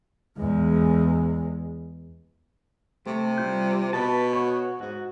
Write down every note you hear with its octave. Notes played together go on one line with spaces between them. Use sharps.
E2 G#3
C3 A3
G3 F4 G6
B2 B4 A5
F#4 C#5
G#2 F#4